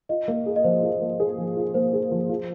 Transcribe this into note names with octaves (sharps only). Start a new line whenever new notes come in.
F4 D#5
A#3
G#4
D#5
F3 C5
F4
A#3
G#4
F3
F4
A#3 C5
G#4
F3
F4